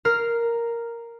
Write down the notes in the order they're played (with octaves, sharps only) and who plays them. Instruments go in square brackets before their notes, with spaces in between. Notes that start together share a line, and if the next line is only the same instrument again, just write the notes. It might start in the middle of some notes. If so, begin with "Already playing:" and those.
[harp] A#4 F6 C7